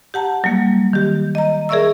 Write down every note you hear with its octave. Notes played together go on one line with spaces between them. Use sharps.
G4 F#5 A5 A#5
F#3 G3 A#3
D#3 G4
D#5 A#5
G#4 A#4 D5 E5 C#6 E6